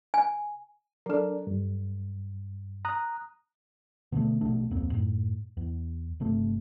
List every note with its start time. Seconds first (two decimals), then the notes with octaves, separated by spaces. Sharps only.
0.14 G#5
1.06 F#3 D4 A4 A#4
1.47 G2
2.85 A#5 D#6 F#6
4.12 B2 D3 E3 A3
4.41 A#1 B2 A3 D4
4.71 D1 F2 A#3 C4
4.92 F#2 A2
5.57 E2
6.20 G1 C3 A3